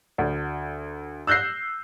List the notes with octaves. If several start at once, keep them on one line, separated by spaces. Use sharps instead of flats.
D2
E6 F#6 G6 A#6 C7